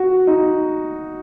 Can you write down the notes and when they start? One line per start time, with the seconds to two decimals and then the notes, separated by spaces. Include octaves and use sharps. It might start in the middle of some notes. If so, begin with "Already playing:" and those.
Already playing: F#4
0.27 D#4